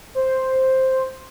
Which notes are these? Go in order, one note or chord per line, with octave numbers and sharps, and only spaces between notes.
C5